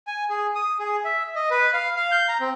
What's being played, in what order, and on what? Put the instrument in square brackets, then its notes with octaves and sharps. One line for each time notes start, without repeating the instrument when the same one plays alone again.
[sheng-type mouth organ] G#5
G#4
D#6
G#4
E5
D#5
B4
F5
F5
G6
A#5
C4